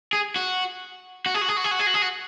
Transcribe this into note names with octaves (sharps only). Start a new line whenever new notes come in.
G#4
F#4
F#4
G#4
F#4
G#4
F#4
G#4
F#4
G#4
F#4
G#4
F#4